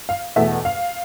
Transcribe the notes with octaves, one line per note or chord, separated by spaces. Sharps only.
F5
E2 B2 A3 E5
F5